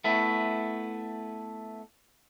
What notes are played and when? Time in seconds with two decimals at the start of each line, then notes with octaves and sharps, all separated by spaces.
0.04 A3 B3 E4